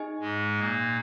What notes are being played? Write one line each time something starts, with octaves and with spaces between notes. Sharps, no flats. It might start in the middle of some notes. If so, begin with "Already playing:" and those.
Already playing: D#4 G#4 D#5 G#5
G#2 G#3
A#2 A#3